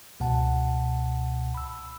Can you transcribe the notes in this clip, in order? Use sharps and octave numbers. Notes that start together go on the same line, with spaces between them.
C#2 B2 F#5 A5
B5 E6